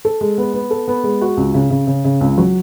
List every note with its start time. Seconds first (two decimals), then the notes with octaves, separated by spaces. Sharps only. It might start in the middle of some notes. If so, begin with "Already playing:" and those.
0.05 A4
0.21 G#3
0.38 B3
0.54 B3
0.70 A4
0.88 B3
1.04 G#3
1.21 F#4
1.37 C#2
1.54 C#3
1.70 C#3
1.87 C#3
2.04 C#3
2.21 C#2
2.38 F#3